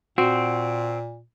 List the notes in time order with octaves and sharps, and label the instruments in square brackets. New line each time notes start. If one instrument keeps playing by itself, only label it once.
[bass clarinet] A#2 [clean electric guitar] C4 [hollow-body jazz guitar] F#4